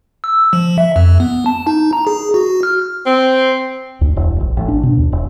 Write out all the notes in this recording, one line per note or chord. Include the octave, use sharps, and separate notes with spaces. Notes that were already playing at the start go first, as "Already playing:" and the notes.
E6
F3
E5
F2
B3
A5
D#4
A#5
G#4
F#4
F6
C4
D2
E1
A#1
A1
D4
B2
D#2
E1